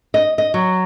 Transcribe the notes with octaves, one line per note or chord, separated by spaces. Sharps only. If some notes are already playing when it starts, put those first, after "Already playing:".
D#5
D#5
F#3